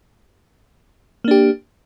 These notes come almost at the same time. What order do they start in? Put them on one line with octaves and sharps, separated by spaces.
A#3 D4 G4